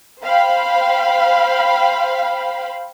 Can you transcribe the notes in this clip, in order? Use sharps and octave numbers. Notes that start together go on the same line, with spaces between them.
C5 F5 G5 B5